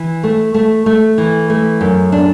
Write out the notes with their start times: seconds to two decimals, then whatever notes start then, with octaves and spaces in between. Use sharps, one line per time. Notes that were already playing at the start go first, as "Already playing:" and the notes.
Already playing: E3
0.24 A3
0.54 A3
0.86 A3
1.18 E3
1.50 A3
1.81 F#2
2.12 D4